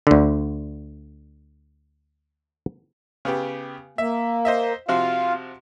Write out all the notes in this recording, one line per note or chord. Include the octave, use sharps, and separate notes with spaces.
D2 D3
C#3 B3 G4
A#3 E5
C5 D#5 E5
C3 F3 F4 F#4 F5